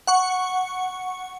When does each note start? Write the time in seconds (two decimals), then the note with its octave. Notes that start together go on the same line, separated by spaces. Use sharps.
0.07 F#5 C#6